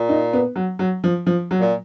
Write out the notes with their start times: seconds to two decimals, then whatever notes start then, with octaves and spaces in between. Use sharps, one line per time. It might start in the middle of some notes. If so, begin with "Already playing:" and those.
Already playing: A#2
0.09 D#4
0.33 B3
0.56 F#3
0.79 F#3
1.04 F3
1.27 F3
1.51 F#3
1.61 A#2